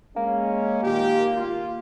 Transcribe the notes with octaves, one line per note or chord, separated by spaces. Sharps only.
G#3 A#3 C#4
A#2 D#3 G4
F4